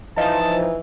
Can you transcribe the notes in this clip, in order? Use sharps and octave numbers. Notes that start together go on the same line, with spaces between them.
E3 F3 D#4 D#5 F5 A5